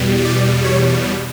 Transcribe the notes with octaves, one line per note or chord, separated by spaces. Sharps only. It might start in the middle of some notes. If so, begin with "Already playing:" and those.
Already playing: E2 B2 G3
D5
C#5